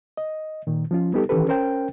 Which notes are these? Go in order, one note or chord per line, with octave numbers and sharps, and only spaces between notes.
D#5
A#2 D#3
F3 C#4 F4
G3 B3 D#4 G4 A4
D#3 E3 C#4 G4 A4 B4
C#4 A#4 C5 G5